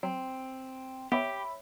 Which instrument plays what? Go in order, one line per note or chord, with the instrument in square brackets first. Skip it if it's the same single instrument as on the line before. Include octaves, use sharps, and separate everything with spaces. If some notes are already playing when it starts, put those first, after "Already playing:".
[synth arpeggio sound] F#3 [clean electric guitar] C4
[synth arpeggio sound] B3 [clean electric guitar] G4 [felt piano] C#5 E5 B5